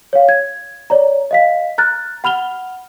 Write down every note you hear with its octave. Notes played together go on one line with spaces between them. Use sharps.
C#5 F5
G#6
C#5 D5 A#5
D#5 F5 B6
A#5 F6 F#6 A6
F#5 B5 F6 F7 G7